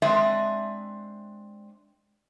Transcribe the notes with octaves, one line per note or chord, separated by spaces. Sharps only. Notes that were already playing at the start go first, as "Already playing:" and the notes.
G#3 C4 D4 D#5 E5